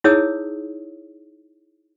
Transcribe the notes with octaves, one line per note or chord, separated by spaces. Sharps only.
D#4 E4 G#4 C#5 D#6 E6